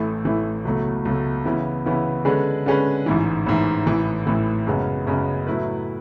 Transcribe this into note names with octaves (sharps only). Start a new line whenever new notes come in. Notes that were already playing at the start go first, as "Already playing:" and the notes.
Already playing: A1 A2 E3 A3
A1 A2 E3 A3
C#2 B2 F#3 A3
C#2 B2 F#3 A3
C#3 E3 B3 E4
C#3 E3 B3 E4
D3 G#3 C#4 G#4 B4
D3 G#3 C#4 G#4 B4
A1 G#2 E3
A1 G#2 E3
A1 A2 E3
A1 A2 E3
F#2 C#3 G#3 B3
F#2 C#3 G#3 B3
A2 F#3 A3 E4 B4